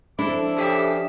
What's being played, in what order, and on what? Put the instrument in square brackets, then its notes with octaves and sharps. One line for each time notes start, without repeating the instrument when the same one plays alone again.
[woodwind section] F3 D6 [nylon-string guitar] D4 [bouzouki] E4 A4
[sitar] C#3 G4 E5